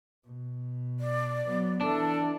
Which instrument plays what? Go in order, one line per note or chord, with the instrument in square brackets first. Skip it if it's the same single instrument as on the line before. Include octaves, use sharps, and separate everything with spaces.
[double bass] B2
[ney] D5
[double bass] F#3 B3
[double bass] E3 [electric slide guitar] D4 [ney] A4